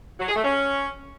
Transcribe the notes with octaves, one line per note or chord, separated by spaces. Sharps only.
F#3
G#4
A3
C#4